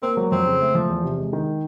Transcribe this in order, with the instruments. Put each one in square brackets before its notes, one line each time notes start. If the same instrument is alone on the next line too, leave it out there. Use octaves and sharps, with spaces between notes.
[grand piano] A#3 [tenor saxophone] C4
[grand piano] F#3
[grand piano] F2 [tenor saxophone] C4
[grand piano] C#3
A3
F3
E2
C3
G#3
D#3